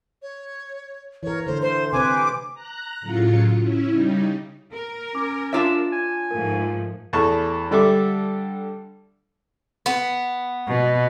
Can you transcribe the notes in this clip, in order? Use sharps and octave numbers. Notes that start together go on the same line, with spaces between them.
C#5
E3 A#4 C#5
D3 A3 C5
C5 C6
C3 B4 C5 G#5 D6
A#5 F#6
A2 C#3 F#3 F4 C#7
C#4 E4
C#3 G3 D#4
A#4
C#4 D6
D4 F4 C#5 E5 D6 E7
G#5
G#2 F3 A3 A#4
E2 A3 A5 C#6
D3 G3 A4 D5 E5 D6
B3
B2